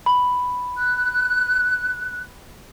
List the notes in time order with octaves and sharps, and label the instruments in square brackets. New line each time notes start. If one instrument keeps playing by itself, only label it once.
[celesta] B5
[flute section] F#6